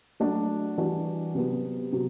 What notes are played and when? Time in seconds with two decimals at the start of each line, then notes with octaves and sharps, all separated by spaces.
0.20 F#3 A3 D4 F#4
0.78 E3 G3 D4 F#4
1.35 C3 F#3 B3
1.92 C3 F#3